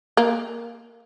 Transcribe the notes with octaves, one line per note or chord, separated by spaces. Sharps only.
A#3